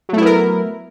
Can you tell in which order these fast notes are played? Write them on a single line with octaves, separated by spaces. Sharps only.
F#3 A3 E4 B3 A#4